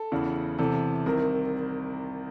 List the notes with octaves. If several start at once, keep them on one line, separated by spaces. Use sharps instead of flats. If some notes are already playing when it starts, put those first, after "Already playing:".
Already playing: A4
E2 C#3 E3
E2 C3 E3 A4
C2 C3 D#3 A#4